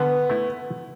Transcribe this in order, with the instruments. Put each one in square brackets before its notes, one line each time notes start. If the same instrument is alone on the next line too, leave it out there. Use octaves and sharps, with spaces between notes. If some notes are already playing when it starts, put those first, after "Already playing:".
Already playing: [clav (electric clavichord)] D3 [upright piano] B3
[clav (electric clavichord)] A3 E4